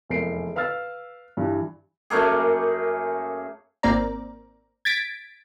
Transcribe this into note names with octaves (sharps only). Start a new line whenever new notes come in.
F1 E2 G#3 A#4 C7 D7
B4 F5 E6 F6 A6
G2 E3 G3
F#2 A3 A#3 G#4
G#1 A#3 C4 D5 A#5
G#6 A6 B6 D7